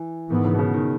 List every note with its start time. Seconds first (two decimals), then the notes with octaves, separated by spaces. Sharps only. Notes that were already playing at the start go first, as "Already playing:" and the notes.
Already playing: E3
0.30 G#2 D#3 E3 B3
0.44 C#3
0.54 B2
0.59 C#3
0.74 D#3